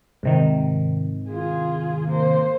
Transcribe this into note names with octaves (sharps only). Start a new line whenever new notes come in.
G#2 C3 D#3
F4 G#4
A#3 C5